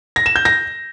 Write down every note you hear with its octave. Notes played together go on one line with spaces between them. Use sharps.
A#6
E7
G6
A#6